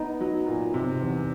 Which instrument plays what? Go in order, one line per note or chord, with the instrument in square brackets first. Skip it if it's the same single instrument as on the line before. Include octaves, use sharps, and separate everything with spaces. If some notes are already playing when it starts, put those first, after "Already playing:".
Already playing: [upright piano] B3 [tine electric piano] D#4
[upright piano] F#3
A#2
C3
E2